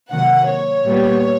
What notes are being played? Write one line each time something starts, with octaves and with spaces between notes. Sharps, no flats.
C3 D#3 F#3 A#3 F#5
C#5
A#2 G3 B3